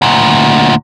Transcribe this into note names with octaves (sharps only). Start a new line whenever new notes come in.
D2 A#2